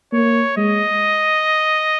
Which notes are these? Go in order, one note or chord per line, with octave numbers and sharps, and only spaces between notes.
A#3 C#5
G#3 D#5